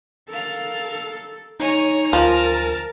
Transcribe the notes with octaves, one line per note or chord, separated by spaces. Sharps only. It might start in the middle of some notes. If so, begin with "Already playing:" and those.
A4 A#4 F5
D#4 C#5 G#5 A#5
D2 F3 A#4 A5